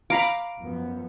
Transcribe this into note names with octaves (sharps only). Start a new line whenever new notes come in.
F5 A#5 B5 D6
F#2 F3 B3